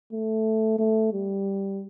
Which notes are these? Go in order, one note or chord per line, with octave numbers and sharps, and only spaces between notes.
A3
A3
G3